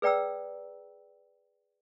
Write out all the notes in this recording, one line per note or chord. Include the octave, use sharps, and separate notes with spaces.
G#4 B4 D5 G5 A#5 E6